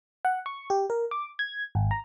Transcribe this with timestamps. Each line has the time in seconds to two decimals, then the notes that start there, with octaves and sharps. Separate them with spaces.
0.25 F#5
0.46 C#6
0.70 G4
0.90 A#4
1.11 D6
1.39 G#6
1.75 G#1
1.91 A#5